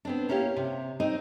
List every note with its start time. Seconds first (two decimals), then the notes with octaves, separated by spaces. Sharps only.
0.05 B3 C4 D4
0.29 A#3 C#4 E4 G4 F5
0.57 C3
1.00 C4 D#4 D#5